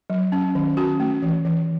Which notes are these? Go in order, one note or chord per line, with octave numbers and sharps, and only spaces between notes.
F#3
C#4
D#3
C#4 F#4
A3
E3
E3